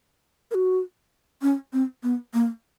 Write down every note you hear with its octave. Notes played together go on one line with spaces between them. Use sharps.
A#4
F#4
C#4
C4
B3
A#3